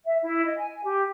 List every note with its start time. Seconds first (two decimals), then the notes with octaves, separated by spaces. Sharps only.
0.05 E5
0.23 E4
0.45 D#5
0.58 G#5
0.85 G4